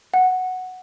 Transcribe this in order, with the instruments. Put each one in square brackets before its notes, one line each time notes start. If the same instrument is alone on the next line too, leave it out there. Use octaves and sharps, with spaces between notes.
[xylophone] F#5